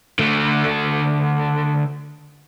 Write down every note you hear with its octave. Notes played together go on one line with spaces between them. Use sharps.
D3 A3